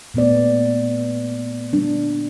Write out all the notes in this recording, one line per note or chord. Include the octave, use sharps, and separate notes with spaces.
A#2 A3 B3 D5
G3 D4